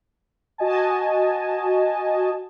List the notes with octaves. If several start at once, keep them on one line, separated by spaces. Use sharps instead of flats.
F#4 D#5 G#5 A5